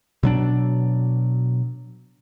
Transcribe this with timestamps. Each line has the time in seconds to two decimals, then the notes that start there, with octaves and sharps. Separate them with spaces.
0.23 B2 F#3 D4